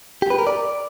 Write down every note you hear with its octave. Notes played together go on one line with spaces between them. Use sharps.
G4
B4
A#4
D5